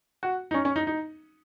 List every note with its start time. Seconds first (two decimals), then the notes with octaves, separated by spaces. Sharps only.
0.23 F#4
0.51 D#4
0.54 C#4
0.65 C#4
0.76 D#4
0.87 D#4